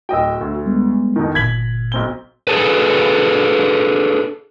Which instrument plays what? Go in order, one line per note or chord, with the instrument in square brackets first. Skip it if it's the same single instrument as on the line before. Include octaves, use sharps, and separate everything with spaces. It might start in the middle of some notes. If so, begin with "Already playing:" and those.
[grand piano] D1 D#5 G5 [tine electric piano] F#4 E6
[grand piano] D2
[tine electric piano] G3 G#3 B3
[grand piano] F2 B2 D#3
[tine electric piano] G1 A#2 [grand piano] G#6 B6 F#7
[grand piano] B1 C4 G7
[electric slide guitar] D4 G#4 A4 B4